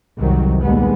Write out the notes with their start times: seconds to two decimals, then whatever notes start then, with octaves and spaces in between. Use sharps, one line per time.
0.18 C2 F2 D#3 F#3
0.62 A#1 D#2 G3 G#3 B3